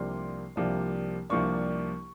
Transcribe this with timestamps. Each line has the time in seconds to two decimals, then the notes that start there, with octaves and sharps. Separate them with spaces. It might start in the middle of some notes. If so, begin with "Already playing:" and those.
Already playing: C2 C3 F3 A#3 D4 C6
0.56 C2 C3 F3 A#3 D4
1.30 C2 C3 F3 A#3 D4 C#6